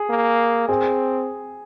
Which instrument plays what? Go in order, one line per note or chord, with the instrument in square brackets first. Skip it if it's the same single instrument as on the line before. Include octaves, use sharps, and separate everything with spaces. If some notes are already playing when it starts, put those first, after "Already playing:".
Already playing: [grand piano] G#4
[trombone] A#3
[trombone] C4 [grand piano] G#4